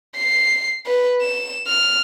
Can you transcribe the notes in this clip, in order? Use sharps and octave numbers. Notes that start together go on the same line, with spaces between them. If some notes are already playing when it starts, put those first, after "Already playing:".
C7
B4
E7
F6